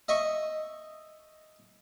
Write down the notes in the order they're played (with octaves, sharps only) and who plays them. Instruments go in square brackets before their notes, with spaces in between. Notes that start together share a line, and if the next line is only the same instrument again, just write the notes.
[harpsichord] D#5 E5 C#6